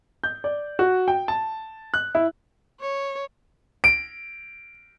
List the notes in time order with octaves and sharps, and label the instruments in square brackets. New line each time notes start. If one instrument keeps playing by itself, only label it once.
[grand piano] G6
D5
F#4
G5
A5
F#6
E4
[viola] C#5
[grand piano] D7